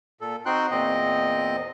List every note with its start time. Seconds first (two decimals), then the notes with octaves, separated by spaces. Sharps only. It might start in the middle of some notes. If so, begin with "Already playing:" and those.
0.21 A#2 A4
0.46 C4 D#4 F#4 G5 C6 F#6
0.71 E2 A#2 C4 D#5